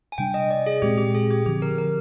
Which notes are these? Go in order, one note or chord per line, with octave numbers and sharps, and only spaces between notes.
G#5
C3 G3 D4 G5
D#5
D5
G#4
A#2 G#3 C4 G4
G4
G#4
G4
D3 F3 C4 G4
A#4
A#4